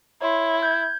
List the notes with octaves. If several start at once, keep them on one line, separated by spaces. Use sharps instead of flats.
E4 C#5 C6
G6 G#6